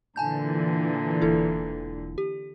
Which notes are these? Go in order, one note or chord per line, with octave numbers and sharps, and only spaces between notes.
A#2 D3 E3 G#5 A5 G6
E1 E4 A4
G4